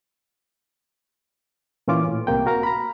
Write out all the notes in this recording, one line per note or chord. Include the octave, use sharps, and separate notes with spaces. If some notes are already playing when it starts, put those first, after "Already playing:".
A#2 E3 C#4 F4 D6
A2
C2 C3 A#3 G5
F#4 A#4 F5 A#5
A#5 B5